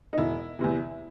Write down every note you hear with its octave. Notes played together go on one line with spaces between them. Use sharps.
D#4
E1 E4
E2 C3 E3